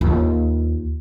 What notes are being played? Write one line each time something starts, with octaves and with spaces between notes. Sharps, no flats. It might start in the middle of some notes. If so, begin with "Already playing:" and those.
D#2 F4